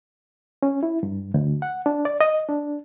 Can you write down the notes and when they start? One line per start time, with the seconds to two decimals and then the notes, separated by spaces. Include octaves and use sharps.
0.63 C#4
0.83 E4
1.03 G2
1.34 D2
1.62 F#5
1.86 D4
2.05 D5
2.21 D#5
2.49 D4